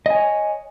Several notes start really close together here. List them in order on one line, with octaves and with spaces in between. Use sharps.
D#5 G#5 C#5